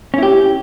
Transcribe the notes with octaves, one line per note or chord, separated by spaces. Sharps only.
C#4 E4 G4